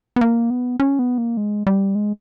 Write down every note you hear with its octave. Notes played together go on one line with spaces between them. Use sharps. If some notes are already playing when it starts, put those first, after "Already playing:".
B3
A#3
B3
C#4
B3
A#3
G#3
G3
G#3